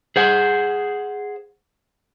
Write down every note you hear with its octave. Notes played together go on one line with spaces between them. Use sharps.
G#4 C5 F#5